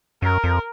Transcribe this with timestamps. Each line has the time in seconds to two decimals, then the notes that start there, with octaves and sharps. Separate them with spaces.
0.22 F#2 A#4
0.44 F2